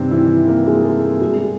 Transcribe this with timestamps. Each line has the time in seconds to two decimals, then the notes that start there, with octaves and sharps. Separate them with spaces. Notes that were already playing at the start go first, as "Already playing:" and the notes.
Already playing: G2 C3 D#3 G3 C4
0.11 E3 E4
0.47 A#3 A#4
0.66 G#3 G#4
0.79 G#4
0.84 A3 A4
1.03 A3 A4
1.21 B2 G3 G#3 G#4